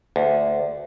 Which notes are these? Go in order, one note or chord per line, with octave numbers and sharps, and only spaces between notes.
D2